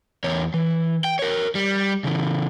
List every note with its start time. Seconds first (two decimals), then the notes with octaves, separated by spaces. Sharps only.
0.24 E2 C#5
0.54 E3
1.04 G5
1.19 A#4 C#5
1.55 G3
2.04 C#3 E3